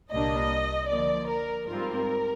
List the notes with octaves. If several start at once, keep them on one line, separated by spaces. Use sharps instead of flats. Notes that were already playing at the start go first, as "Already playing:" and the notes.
C2 A#2 G3 A#3 D4 D#5
D3 F3 A#3 D5
A#4
G#2 G3 C4 F4 A#4